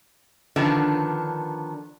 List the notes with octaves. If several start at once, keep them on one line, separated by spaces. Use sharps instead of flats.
D3 D#3 F3 B3 C#4 D4